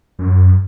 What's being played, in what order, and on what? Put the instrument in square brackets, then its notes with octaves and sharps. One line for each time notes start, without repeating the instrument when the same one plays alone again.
[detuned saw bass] F#2